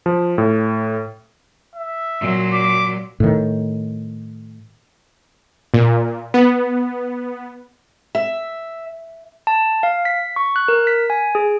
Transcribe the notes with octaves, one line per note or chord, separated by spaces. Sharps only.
F3
A2
E5
A#2 F#3
D6
A2 D#3
A#2
B3
E5
A5
F5
B6
C#6
F#6
A#4
B6
G#5
G#4